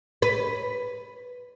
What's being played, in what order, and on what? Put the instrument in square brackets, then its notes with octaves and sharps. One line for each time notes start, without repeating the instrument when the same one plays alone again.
[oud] B4